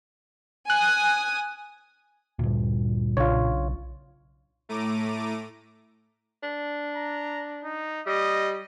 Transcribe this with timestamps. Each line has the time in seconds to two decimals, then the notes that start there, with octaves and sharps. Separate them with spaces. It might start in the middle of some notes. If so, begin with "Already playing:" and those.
0.70 G#5 D#6 F#6
2.39 D2 G2 A#2
3.17 B1 C#3 D4 F4 C#5
4.69 A2 A3 A#5 D6 D#7
6.43 D4
6.96 A#5
7.65 D#4
8.07 G3 D#5